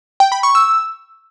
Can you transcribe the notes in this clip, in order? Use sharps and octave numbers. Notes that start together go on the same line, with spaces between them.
G5
B5
C#6
E6